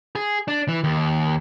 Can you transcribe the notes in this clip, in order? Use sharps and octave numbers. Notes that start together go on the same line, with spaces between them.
G#4
D4
E3
D#2